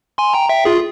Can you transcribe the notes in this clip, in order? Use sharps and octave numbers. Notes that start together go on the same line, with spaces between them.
G#5 C6
G5 A#5
E5 G5
F4 G#4